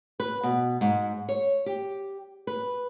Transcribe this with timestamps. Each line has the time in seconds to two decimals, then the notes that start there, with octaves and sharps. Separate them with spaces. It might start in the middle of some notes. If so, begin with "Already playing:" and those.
0.20 B4
0.43 B2
0.81 G#2
1.29 C#5
1.66 G4
2.47 B4